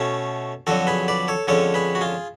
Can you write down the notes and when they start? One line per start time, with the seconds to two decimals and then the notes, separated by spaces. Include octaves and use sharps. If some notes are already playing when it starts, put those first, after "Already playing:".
Already playing: B2 A3 C#4
0.67 F2 D3 F#3 F#4 A4
0.87 G#4 B4
1.08 B4 D5
1.28 A4 C#5
1.48 F2 D3 G#3 C#4 A4 C#5
1.74 G#4 B4
1.95 F#4
2.01 F4 G#4